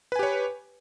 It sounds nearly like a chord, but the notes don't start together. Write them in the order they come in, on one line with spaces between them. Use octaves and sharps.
B4 G#5 G4 C#5